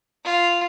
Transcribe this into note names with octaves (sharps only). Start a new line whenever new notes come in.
F4